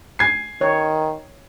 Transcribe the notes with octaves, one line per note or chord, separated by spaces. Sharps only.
G#5 G#6 C7
D#3 C#5